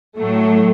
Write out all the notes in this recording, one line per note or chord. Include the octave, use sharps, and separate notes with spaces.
A2 F#3 A3